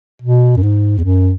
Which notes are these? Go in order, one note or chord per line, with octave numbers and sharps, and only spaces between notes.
B2
F#2
G#2
E2
F#2